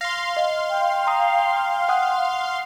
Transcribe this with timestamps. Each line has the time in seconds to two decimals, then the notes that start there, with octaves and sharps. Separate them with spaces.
0.01 F5 C6 A#6
0.37 D#5
0.70 G5
1.07 A#5 D#6
1.89 F#5 D#6 F#6